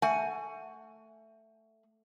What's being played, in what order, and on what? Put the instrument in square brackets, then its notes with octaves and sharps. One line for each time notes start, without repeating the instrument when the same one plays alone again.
[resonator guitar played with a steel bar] A3 F#5 G#5